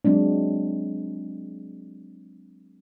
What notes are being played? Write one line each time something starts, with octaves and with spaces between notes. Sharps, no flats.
F#3 G#3 C4 D4